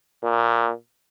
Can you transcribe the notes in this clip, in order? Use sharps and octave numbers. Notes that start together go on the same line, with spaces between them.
A#2